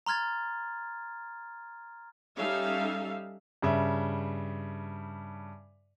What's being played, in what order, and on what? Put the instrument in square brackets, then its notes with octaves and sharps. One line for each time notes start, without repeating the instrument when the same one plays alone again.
[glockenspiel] A#5 C6 F6 G#6 A6
[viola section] G3 C#4 D#4 A4 E5 F5
[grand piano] G2 C#3 E5